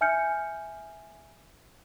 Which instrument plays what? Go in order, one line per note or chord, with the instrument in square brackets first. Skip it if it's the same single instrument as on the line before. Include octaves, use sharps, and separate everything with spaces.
[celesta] E5 G#5 F6 G6 C#7